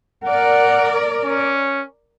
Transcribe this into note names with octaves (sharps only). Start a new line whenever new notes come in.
A#4 D5 F#5
C#4